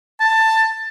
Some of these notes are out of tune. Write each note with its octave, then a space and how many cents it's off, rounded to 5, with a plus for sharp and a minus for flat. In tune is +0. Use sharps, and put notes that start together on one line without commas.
A5 +15